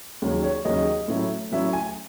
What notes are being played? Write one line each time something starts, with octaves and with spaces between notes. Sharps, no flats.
D#2 C#3 F#3 C#4
C#5
D#2 C#3 F#3 C#4 D#5
A2 F#3 C#4 E4
A2 F#3 C#4 E4 E5
G#5